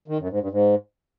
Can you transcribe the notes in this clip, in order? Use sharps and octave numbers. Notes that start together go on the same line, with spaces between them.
D#3
F#2
G#2
G2
G#2